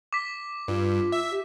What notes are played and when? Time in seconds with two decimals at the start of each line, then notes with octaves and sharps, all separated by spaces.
0.13 D6 B6
0.68 G2 F4
1.12 E5
1.31 G4